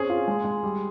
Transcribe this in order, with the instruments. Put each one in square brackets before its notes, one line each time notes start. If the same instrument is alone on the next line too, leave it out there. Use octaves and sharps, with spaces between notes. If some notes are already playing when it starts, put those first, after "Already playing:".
Already playing: [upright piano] C4 C#4 [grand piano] G#4
[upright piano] F4
G#3
G#3
G3